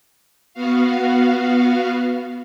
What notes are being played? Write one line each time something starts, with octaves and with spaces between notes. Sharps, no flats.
B3 F#4 F5